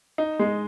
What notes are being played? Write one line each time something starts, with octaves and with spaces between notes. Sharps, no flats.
D#4
G#3